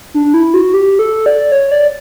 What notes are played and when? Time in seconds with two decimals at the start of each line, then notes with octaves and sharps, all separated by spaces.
0.14 D4
0.34 E4
0.54 F#4
0.74 G4
0.99 A4
1.26 D5
1.52 C#5
1.72 D5